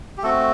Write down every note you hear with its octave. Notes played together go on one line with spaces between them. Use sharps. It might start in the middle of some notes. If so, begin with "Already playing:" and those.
G4
A3 C4 F#4 A4